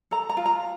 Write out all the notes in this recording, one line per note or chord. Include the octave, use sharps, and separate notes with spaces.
A4 A#5
A#5
F4
A#5